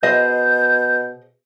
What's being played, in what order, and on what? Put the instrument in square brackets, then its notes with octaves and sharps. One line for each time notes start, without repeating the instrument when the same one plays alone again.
[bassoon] B2 [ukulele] G#4 C5 D#5 [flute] G6